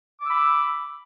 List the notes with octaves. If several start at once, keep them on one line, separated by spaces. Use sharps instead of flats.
B5 D6 E6